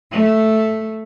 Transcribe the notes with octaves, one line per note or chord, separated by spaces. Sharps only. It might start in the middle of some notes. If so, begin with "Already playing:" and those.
A3